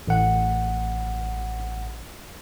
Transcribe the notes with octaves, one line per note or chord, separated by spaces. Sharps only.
A1 F#5